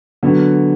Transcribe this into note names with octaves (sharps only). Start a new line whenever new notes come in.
D3 F#3 B3